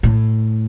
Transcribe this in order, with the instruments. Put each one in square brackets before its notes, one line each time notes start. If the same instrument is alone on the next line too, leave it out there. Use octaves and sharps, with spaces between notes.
[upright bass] A2